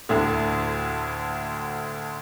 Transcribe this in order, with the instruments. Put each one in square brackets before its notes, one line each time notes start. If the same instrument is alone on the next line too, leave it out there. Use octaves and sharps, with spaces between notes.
[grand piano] D2 A2 D3